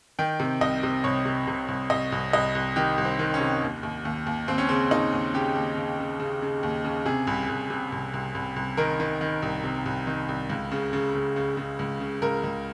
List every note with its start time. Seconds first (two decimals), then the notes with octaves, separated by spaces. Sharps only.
0.19 D#3 G5
0.40 C3
0.61 C2 D#5
0.83 C3
1.04 C2 C#5
1.25 C3
1.47 C3
1.68 C2
1.90 C2 D#5
2.12 C2
2.33 C2 D#5
2.55 C2
2.76 D#3 G4
2.98 C2
3.05 C4
3.19 D#3
3.34 C#4
3.40 C3
3.63 D#2
3.83 D#2
4.05 D#2
4.27 D#2
4.48 D#2 C4
4.58 C#4
4.69 C#3 C4
4.91 D#2 D#4
5.12 D#2
5.34 C#3 G4
5.56 D#2
5.77 C#3
5.99 C#3
6.20 C#3
6.42 C#3
6.63 D#2
6.84 C#3
7.06 C3 G#4
7.27 C2
7.49 C2
7.70 C3
7.92 C2
8.13 C2
8.35 C2
8.56 C2
8.77 D#3 A#4
9.00 D#3
9.21 D#3
9.42 C2
9.64 C3
9.86 C2
10.07 D#3
10.29 C2
10.50 C#2
10.71 C#3
10.93 C#3
11.15 C#3
11.36 C#3
11.57 C#3
11.79 C#2
12.00 C#3
12.22 C#2 A#4
12.43 C#2